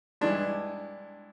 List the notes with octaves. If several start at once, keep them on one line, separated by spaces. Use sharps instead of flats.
G2 E3 G#3 D4